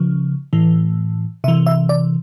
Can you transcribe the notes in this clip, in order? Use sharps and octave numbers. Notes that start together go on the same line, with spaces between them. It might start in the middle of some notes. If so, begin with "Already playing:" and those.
Already playing: C#3 F3
A2 E3
C3 E3 E5
E5
D5